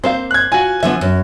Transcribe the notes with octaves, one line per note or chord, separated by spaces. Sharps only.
A#3 C4 C5 F5
F#6 G#6
F4 F#4 G#5
D3 F3 B3 E5
F#2